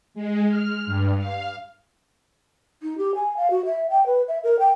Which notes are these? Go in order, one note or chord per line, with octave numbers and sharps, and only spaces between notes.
G#3
F6
G2
F5
D#4
G4
G#5
F5
F#4
E5
G5
B4
E5
A#4
G5